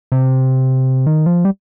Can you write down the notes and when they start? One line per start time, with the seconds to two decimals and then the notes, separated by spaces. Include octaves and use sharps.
0.12 C3
1.06 D#3
1.26 F3
1.45 G3